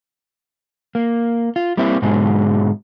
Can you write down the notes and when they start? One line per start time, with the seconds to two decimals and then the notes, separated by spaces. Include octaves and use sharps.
0.95 A#3
1.56 F4
1.77 G3 A#3 C4 E4
2.02 G#2 B2 D3 F#3 G#3